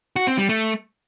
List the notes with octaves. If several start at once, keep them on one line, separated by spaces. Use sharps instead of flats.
F#4
C4
G3
A3